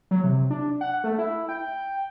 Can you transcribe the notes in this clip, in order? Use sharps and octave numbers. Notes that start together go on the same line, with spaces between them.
F#3
C3
D4
F#5
A3
E4
G5